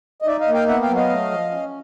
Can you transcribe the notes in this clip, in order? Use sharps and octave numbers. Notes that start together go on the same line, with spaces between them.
D#5
D#4 D5 E5
D#5 F5
A#3
F5 G5
B3 E5 F#5
F5 G5
F#3
D#5 F5
A3
F3
C#4